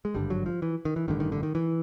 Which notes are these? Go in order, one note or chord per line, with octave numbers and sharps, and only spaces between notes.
G#3
G#1 G2 D3 G3
F#3
F3
E3
D#3
E3
A1 G2 D3 D#3
D#3
D3
D#3
E3